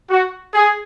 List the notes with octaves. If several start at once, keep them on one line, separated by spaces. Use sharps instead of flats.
F#4
G#4